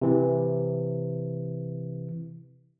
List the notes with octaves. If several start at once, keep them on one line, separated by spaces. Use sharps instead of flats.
C3 E3